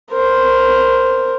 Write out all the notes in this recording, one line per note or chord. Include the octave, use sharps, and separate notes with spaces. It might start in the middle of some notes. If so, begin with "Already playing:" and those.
A#4 C5